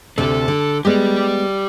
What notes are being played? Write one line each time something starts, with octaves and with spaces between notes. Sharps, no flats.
D2 C3 D4 A4
D3
G#3 B3 G4 D5